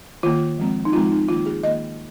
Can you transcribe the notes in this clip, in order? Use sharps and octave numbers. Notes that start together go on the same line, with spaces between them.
D#3 A#3 F4
F3 G#3 C4
D#4
F3 G#3 C4 F4
D#4
D#3 A#3 F4
G#4
D#3 A#3 D#5